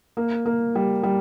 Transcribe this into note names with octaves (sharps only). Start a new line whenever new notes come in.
A#3
A#3
G3
G3